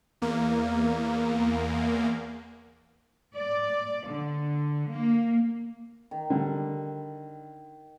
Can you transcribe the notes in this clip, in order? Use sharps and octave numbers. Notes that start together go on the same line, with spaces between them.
E2 A#3
D5
D3
A#3
D#3
D3 G3